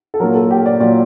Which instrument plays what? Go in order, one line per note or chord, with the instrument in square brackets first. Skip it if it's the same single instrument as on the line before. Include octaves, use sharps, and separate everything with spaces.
[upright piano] A4
A#2 F#3 A#4
A4
G4
D5
A#2 F#3 D5